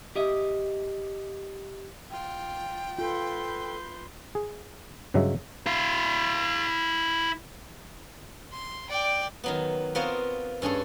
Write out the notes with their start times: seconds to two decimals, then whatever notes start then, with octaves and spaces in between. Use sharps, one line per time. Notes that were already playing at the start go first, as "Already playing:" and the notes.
0.16 G4 D#5 E5
2.11 F4 G5
2.99 F4 A4 B4 C6 G6
4.35 G#4
5.14 G2 C#3 F#3 G#3 E5
5.67 E4 F5
8.52 C6
8.90 D5 G5
9.44 D#3 F#3 B3
9.95 B3 C4 F4 A#4 C#5 D#5
10.62 G2 C#4 G#4 A4